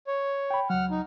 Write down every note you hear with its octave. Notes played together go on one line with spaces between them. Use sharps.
C#5
G5 B5
C#2 F#3 F#5 F6
D#4